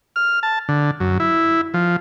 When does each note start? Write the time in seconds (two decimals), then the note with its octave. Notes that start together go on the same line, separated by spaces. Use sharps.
0.16 F6
0.43 A5
0.69 D3
1.00 F#2
1.20 E4
1.74 F3